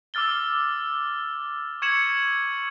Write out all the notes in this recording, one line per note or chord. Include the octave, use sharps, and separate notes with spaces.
D6 E6 F6 A6 G7
C#6 G#6 C#7 E7 F#7